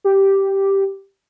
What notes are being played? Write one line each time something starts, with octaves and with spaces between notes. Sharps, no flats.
G4